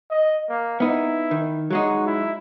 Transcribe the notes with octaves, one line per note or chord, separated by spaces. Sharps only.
D#5
A#3
B3 D#4 E4
D#3
F#3 G#3 D#4 F#4
E4